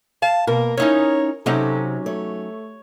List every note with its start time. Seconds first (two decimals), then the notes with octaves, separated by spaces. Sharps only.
0.22 F5 A5
0.47 B2 A#3 A#4
0.78 C#4 D#4 E4 C#5
1.46 C3 F#3 C#4 D#4 A4
2.06 A3 C#5